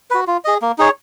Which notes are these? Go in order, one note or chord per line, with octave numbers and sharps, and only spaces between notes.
F#4 B4
F4
G#4 D#5
A#3
D#4 G#4 C#5